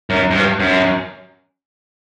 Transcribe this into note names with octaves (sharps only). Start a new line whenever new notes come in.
F#2
F#2
G2
F#2